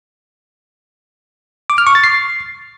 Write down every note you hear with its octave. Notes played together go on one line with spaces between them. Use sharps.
D6
F6
C#6
A6
C7